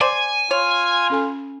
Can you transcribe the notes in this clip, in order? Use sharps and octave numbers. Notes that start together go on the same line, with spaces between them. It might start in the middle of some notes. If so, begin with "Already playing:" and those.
C5 D5 G#5
F4 C#5
C#4 A4 G#5